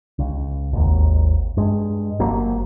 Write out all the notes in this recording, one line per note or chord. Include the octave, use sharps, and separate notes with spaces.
C#2
G#1 D#2 D#3
G2 G#3
G1 F3 F#3 A#3